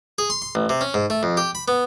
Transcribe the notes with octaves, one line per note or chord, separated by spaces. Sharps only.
G#4
C6
C6
A1
C3
C#4
G#2
A3
F2
G4
B5
B3